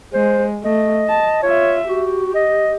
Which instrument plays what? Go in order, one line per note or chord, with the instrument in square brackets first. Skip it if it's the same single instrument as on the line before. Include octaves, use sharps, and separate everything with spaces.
[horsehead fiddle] G#3 [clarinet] C5
[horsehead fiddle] A3 [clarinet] D#5
[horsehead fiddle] A5
[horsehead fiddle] F4 E5 [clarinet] C#5
[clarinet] F#4 [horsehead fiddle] G4
[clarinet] D#5